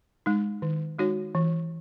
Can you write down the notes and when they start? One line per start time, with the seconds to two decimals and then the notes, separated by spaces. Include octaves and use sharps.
0.26 G#3 D#4
0.62 D#3
0.99 G#3 D#4 F#4 C#5
1.35 E3